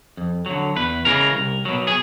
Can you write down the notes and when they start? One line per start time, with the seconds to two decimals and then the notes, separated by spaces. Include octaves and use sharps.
0.17 F2
0.46 D3 F#3
0.76 E2 B4
1.05 C#3 E3 G#3 A#4
1.35 C2
1.65 B2 F#3
1.87 G#4